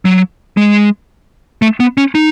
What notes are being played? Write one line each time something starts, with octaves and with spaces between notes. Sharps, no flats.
F#3
G#3
A3
B3
C#4
D#4